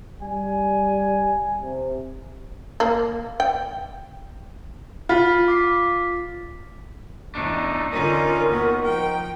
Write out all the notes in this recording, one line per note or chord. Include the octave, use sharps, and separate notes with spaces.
G3 G#5
C3
A#3
G5
F4 B5 B6
D6 B6 C7
E2 A3 D4 D#4
D3 C#4 D#4 F4 A#4
D#2 B3 F#4
F3 G5